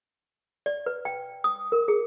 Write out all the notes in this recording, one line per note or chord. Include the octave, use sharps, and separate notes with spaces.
D5
B4
G5
D#6
A#4
G#4